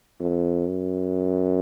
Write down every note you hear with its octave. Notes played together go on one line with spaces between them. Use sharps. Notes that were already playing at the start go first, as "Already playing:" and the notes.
F2
F#2